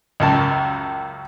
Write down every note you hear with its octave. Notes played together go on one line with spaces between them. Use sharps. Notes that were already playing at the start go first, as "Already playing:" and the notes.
C#2 F#2 A5